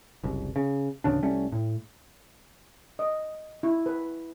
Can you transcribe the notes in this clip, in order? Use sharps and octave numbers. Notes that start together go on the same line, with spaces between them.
F#1 C2
C#3
A1 D2 C#3 D4
C2 G3 A3 C#4
A2
D#5
E4
B4